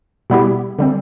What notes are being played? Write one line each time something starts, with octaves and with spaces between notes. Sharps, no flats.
B2 G3 B3 E4 G4
D3 G3 C4